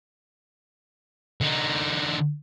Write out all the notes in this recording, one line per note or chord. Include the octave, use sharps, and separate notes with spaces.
D3 D#4